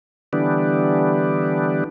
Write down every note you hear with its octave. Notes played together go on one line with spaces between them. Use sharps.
D3 E3 G3 B3 D4